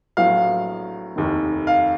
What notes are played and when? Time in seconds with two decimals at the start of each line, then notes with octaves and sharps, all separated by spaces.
0.17 A#1 A2 F#3 B3 F5
1.16 F1 D#2 D#3
1.67 F5